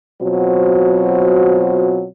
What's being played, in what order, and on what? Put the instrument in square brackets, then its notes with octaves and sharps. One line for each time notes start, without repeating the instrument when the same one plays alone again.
[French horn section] B2 F#3 C4 F4 F#4 C5